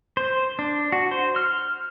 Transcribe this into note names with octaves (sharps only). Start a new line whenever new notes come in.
C5
D4
F#4
C5
F6